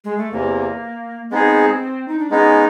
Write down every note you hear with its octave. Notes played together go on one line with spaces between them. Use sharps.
G#3
A3
E2 C3 E3 A#3
G#3 B3 C4 D#4 G#4
D#4
D4
G#3 B3 C#4 D#4